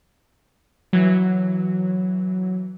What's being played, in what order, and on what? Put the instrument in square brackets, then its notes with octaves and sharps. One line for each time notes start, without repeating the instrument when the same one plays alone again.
[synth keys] E3 F#3